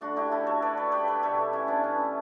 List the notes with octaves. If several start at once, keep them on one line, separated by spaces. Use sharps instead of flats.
D3 A3 D4 F#4
E4 G4
F#4 A4
A4 C#5
B4 D5
A4 C#5
G4 B4
B4 D5
B2 A3 A4 C#5
C#4 E4
B3 D4
C#4